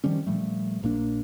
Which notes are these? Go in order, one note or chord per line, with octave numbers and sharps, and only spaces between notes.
D#3 F3 G3 C#4
A#2 F3 G3 A3
A#1 A#2 A#3 D4